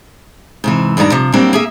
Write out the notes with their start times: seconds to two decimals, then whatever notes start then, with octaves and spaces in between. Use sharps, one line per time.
0.64 G#2 C3 E3
0.97 G2 D#3 D4 A4 A#5
1.12 C3 F3
1.33 F#3 G3 A#3 C4 D4 E4
1.53 A#3 G#4 E5